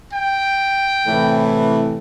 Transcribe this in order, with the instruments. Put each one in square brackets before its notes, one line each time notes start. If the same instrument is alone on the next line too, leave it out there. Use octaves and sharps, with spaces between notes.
[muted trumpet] G5
[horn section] A2 C3 E3